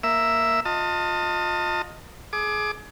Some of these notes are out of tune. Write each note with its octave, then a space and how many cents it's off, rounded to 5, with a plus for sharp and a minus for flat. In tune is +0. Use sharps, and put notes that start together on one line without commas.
A#3 +0 E5 +0
F4 +20 D#5 +0 A5 +30
G#4 +25 D6 +15